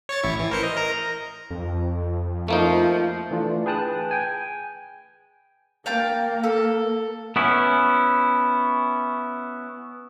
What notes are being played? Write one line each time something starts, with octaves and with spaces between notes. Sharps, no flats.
C#5 C#6 A6
A1 E4 C#6
E3
A#4 C5 C#7
D#5
A#4 A#5
F2
F3 A3 A#3 D#4
E3 A3 D4 F4
G#4 B4 G5 A5 D#6 F#6
G5 G#5
A#3 F5 G5 A5
A4
B3 C#4 E4